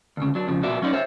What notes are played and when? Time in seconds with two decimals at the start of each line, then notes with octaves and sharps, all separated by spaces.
0.17 D2 C#3
0.35 F#3 D4
0.48 F2 C#3 F3
0.63 B1 A#2 B3 F#4 D5 E5
0.82 F#3 C#4 D#4 E4 C#5 D5
0.93 C5 C#5 E5